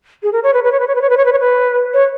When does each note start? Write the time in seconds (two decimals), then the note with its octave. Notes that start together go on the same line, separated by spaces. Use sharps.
0.23 G#4
0.32 A#4
0.43 C#5
0.53 B4
0.64 B4
0.72 C#5
0.80 B4
0.87 C#5
0.95 B4
1.02 C#5
1.10 B4
1.17 C#5
1.25 B4
1.33 C#5
1.40 B4
1.94 C#5